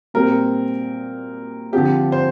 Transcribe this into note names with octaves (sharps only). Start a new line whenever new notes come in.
A#2 G3 C4 A#4
D3 F3 C4 G4
C5